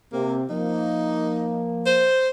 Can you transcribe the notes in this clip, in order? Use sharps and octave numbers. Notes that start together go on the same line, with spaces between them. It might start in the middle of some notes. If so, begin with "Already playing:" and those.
C3 A#3
F3 A#3 D#4
C5